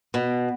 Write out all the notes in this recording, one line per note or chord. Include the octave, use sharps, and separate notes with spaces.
B2